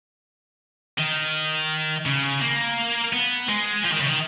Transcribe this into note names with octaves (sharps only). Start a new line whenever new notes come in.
D#3
C#3
A#3
B3
G#3
F3
D#3
C#3
D#3